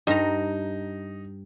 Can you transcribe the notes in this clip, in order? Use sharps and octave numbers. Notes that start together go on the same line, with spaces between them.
G2 D#4 A#5